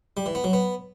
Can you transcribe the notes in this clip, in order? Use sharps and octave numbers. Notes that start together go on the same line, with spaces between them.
G3
E3
B3
F#3
B3